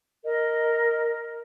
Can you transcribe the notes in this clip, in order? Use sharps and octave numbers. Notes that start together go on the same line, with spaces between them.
A#4 D#5